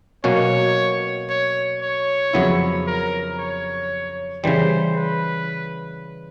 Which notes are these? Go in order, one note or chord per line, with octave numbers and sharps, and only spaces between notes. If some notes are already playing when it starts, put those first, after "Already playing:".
B2 F#3 A#3 C#4 F#4 C#5
C#5
C#5
F2 C#3 F#3 B3 E4
A#4
C#5
C#3 E3 G3 C5
B4